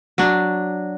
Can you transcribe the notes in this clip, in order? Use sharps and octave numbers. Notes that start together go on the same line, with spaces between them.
F#3 D4